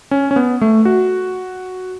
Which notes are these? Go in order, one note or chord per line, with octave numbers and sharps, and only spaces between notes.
C#4
C#4
B3
A3
F#4